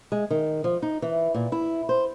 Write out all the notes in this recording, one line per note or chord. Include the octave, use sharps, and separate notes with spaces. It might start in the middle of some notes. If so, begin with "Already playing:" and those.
G#3
D#3
F3
D#4
E3
A#2
E4
C5